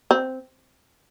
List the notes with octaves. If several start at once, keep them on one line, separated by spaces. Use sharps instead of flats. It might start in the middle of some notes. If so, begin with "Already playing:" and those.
C4